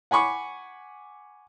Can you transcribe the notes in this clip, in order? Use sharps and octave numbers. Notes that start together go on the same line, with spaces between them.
F#5 G#5 B5 C#6 D6